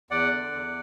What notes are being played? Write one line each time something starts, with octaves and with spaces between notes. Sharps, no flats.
E2 D5 F#5
D3
E2